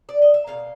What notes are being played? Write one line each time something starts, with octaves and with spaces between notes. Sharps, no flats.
D5
D#5
E5
B2 F#3 A#3 F5